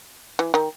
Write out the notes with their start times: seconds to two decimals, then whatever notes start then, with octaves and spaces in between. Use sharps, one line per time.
0.39 E3
0.54 D#3